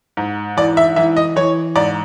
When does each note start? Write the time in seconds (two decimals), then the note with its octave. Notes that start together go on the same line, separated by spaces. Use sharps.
0.17 G#2
0.57 E3 D5
0.77 E5
0.96 E3 E5
1.17 D#5
1.36 E3 C#5
1.76 G#2 D5